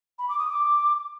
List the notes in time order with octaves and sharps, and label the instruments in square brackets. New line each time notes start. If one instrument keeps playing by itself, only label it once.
[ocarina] B5
D6
D#6
D6